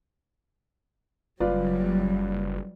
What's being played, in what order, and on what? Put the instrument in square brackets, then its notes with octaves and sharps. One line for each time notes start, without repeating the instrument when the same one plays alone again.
[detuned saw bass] F#1 [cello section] F#3 G3 [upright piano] F4 B4 D5